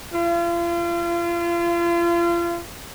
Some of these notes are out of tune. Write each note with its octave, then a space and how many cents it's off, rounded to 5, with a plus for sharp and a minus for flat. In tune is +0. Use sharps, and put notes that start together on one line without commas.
F4 -35